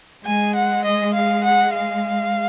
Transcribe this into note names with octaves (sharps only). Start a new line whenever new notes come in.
G#3 G#5
F#5
D#5
F5
F#5
F5